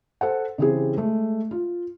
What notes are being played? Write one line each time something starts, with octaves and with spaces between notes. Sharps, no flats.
A4 C5 F#5
C#3 E3 C4 G4 G#4
G#3 A3
F4